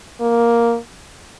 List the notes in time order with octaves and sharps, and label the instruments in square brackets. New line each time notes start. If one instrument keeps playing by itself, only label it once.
[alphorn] A#3